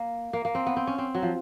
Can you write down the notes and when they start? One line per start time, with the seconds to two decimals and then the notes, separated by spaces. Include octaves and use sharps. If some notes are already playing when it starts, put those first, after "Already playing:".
Already playing: A#3
0.33 A#3
0.45 A#3
0.55 C4
0.66 B3
0.77 C4
0.87 C#4
0.98 C4
1.15 F#3
1.22 F3